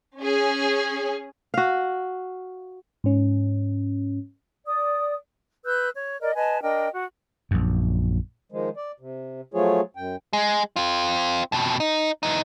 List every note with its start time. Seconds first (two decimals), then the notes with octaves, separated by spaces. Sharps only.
0.19 C#4 G#4
1.54 F#4 F5
3.04 G#2 C#4
4.66 D5 D#6
5.65 B4 E6 F#6 G6
5.95 C#5
6.21 A#4 D5 D#5
6.35 B4 D#5 G#5 A5
6.62 D4 A#4 D#5 G5
6.92 F#4
7.51 A#1 F#2
8.52 D#3 F3 G#3
8.76 D5
9.00 C3
9.54 F3 F#3 A3 F4 G#4 C#5
9.96 F#2 G5
10.33 G#3
10.76 C4 F4
11.52 F2 B2
11.80 D#4
12.23 E3 D#4